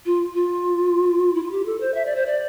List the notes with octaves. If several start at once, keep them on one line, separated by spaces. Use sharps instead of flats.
F4
F4
E4
F4
G4
A4
C5
E5
D5
C5
D5